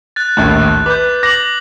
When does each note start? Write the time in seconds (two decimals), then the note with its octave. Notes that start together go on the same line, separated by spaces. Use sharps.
0.16 F#6 A6
0.37 A#1 D#2 A2
0.86 B4 D6 G6
1.23 D6 A#6 F#7